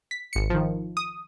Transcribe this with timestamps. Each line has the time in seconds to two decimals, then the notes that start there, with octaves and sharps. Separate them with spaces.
0.11 B6
0.33 G#1 C#7
0.50 D#3 F3
0.97 D#6